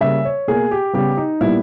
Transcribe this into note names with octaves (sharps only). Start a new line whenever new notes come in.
C#3 G3 A#3 E5
C#5
B2 A#3 G#4
G4
C#3 G3 B3 G4
D#4
A#2 G3 B3 E4